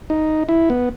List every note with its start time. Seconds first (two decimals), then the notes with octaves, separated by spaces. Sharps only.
0.10 D#4
0.49 E4
0.70 B3